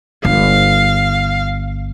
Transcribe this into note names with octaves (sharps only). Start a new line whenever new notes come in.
G1 F5